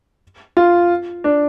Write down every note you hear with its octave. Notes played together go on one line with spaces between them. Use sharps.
F4
D4